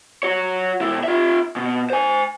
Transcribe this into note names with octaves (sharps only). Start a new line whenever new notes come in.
F#4 C#5
B2 E4
F4 E5
B2
C5 G#5